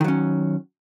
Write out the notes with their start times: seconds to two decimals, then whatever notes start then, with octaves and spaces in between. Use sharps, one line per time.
0.01 D#3
0.04 F#3
0.08 C#4